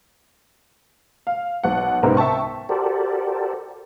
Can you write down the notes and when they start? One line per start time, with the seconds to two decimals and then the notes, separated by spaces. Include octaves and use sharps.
1.27 F5
1.64 B1 F#5
2.03 C#2 G#2 C3 B3 C4 A#4
2.17 E5 G5 A5 C#6
2.69 F#4 G4 A4 A#4 C5 D5